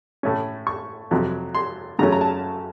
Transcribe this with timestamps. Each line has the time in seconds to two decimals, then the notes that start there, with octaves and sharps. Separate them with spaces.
0.23 A2 A3 C#4
0.67 C#6
1.11 F2 C3 F#3
1.55 C6
1.99 F#2 C#3 F#3 A3 C#4 A#5
2.12 A#5
2.21 A5